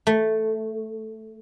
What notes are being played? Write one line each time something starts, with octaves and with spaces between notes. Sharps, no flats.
A3